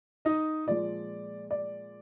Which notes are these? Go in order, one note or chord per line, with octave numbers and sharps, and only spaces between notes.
D#4 D#5
A#2 F3 G#3 D5
D5